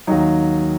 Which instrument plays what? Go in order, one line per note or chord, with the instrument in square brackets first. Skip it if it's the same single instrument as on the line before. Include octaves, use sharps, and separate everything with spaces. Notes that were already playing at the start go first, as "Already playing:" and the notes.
[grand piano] D#2 D#3 F#3 D#4